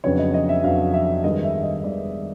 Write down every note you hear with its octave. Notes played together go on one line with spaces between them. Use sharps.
F2 C#3 F#3 B3 D4 C#5
D#5
D#5
E5
F2 C#3 F#3 B3 D4 F5
E5
G2 D#3 G#3 B3 D#5
E5
D#5
G2 D#3 G#3 B3 D5